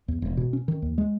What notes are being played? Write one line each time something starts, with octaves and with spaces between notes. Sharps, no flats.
E2
E1
B2
C#4
D#3
D#2
G#3